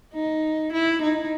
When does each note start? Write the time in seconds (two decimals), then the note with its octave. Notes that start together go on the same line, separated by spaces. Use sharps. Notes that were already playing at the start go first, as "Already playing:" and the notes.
0.13 D#4
0.72 E4
1.02 D#4